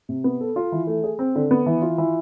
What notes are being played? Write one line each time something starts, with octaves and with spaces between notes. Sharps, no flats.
C3
B3
A4
F4
E3
A3
G#4
C4
D3
B3
E3
F4
E3